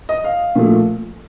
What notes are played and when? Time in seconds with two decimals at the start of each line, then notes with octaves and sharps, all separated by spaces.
0.09 D#5
0.24 F5
0.56 A#2 F3 A3